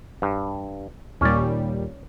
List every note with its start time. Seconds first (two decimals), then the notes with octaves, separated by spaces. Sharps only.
0.22 G2
1.21 D#2 A#2 G3 C#4 D5